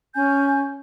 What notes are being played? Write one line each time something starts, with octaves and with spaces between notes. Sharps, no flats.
C#4 G#5 G6